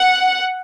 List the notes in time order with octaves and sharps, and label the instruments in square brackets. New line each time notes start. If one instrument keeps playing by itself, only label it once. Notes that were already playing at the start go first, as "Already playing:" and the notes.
Already playing: [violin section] F#5